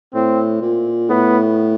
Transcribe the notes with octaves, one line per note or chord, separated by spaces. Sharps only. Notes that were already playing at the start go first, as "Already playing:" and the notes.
A2 C4
A#2
A2 B3